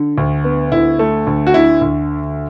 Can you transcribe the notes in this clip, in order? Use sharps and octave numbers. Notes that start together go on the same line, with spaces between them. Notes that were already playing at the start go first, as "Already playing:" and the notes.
Already playing: D3
D2
B3
D2 E4
A3
D2
F#4
D3 E4
D2